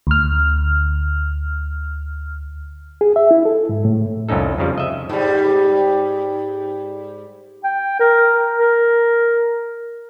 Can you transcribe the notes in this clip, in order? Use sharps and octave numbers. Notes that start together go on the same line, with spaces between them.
D2 F6
G#4
E5
E4
A4
G#2
A2
C2 F2 C#4 D#4 A4
F2 C#3 F3 G3
D#5 E5
G#2 G3
G5
A#4
A#4